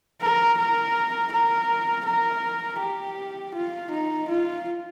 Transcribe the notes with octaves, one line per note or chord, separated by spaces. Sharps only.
A#4
A#4
A#4
A#4
G4
F4
D#4
F4